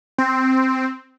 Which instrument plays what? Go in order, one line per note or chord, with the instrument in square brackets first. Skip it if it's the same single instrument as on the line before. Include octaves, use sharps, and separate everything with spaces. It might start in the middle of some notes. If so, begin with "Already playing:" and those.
[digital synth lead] C4